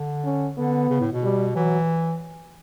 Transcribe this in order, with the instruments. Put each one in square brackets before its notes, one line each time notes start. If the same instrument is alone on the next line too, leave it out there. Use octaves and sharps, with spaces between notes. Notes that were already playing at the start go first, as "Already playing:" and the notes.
Already playing: [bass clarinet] D3
[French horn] C#4
[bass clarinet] D3 [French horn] B3
[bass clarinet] C#3
A2
B2
[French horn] G3
[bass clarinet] E3 [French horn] F#3